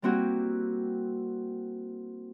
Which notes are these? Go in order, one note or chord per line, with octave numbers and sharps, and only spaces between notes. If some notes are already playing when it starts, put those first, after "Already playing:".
G3 A#3 C4 E4 F#4 G4